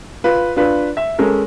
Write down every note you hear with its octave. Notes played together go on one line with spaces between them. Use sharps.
F4 B4
D4 F4 B4
E5
G#3 C#4 A4 A#4